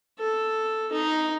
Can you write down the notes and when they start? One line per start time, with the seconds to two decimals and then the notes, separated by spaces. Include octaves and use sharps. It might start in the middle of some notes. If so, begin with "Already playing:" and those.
0.19 A4
0.92 D#4